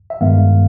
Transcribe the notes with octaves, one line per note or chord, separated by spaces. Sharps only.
E5
G2 D#3 G#3 B3 F5